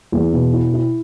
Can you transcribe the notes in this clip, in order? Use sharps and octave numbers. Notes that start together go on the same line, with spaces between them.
E2
B2
E4
E4